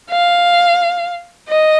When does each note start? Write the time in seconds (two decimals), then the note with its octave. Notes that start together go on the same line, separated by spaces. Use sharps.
0.11 F5
1.49 D#5